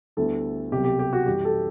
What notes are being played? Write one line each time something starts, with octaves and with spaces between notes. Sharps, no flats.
D2 D3 G3 B3 E4 A4
C2 B2 F#3 G4
G4
G4
F#4
F#2 E3 G3 G4
A4